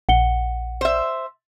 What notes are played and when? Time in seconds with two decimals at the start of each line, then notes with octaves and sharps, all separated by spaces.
0.09 A#1 F#5 C#7 G7
0.81 C5 E5